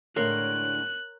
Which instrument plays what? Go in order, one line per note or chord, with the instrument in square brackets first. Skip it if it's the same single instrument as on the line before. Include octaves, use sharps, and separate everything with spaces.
[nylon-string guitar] A2 D3 G#3 [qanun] A#4 C#5 C6 [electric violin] F#6